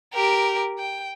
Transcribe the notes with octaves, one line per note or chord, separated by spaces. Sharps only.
G4 A#4
G5